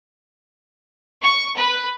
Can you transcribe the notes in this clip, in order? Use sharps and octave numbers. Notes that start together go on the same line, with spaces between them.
C#6
B4